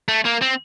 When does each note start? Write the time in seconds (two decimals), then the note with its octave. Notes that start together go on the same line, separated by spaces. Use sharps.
0.08 A3
0.25 A#3
0.41 C4